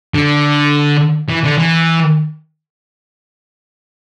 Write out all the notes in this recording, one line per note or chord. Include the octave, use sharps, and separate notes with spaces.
D3
E3
D3
E3